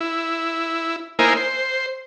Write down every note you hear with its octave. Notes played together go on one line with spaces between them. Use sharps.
E4
A#3 D#4 E4 A#4 C5 G#5
C5